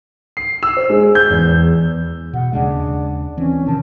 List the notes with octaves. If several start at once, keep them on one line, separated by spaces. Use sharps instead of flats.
C7
E6
C5
G#3
G6
E2
B2 F#5
D#2 C#3 G#3 D4
E3 C4 C#4
C3 D#3 A5